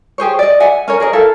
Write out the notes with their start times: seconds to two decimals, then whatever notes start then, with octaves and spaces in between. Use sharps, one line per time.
0.18 G4 G#4 C5 C#5
0.39 D5 D#5
0.60 E5 F#5 G#5
0.88 C#4 A#4 C#5
1.00 G#4 A#4 C#5 D#5
1.13 E4 A4 A#4 F5